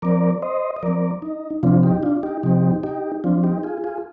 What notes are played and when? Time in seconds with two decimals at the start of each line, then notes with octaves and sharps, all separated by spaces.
0.02 F3 C4 A#4 D5
0.42 C5 D#5
0.76 D#5
0.83 F3 C4 A#4 D5
1.22 D#4
1.63 C3 F3 C4 D4 F4
1.83 D#4 G4
2.03 D4 F4
2.23 D#4 G4
2.43 C3 F3 C4 D#4 G4
2.83 D#4 G4
3.24 F3 C4 D4 F4
3.44 D#4 G4
3.63 F4 G#4
3.84 F4 G#4